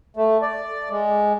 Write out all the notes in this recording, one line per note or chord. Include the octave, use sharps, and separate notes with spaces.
A3
D5
G#3